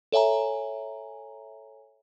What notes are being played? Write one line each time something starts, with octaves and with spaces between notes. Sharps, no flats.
A4 C#5 E5 G#5 A#5